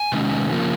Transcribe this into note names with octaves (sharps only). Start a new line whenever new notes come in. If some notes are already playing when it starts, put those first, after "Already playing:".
Already playing: G#5
C3 D#3 G#3 C#4
C#3 F3 A#3